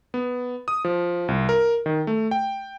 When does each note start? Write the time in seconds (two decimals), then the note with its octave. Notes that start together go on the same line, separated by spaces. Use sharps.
0.14 B3
0.68 D#6
0.85 F3
1.28 C2
1.49 A#4
1.86 D#3
2.07 A3
2.31 G5